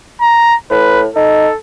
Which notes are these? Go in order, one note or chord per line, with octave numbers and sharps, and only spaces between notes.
A#5
A2 B4
D#4 A4